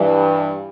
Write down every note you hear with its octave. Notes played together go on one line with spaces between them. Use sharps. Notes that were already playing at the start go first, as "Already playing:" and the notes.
Already playing: G2 E3 G3